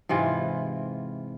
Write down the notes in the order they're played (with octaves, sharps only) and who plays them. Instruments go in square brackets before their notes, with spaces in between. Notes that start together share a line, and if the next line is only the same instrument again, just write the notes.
[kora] G#2 C3 E3 F4